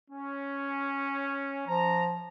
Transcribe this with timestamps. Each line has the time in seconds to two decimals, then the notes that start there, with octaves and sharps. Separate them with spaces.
0.10 C#4
1.68 F3 A#5